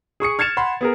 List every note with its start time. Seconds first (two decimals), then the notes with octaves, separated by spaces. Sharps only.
0.20 G#4 C#6 D#6 C#7
0.39 F6 G#6 A6 C#7 E7 F7
0.57 F#5 B5 C6
0.81 B3 G#4 A#4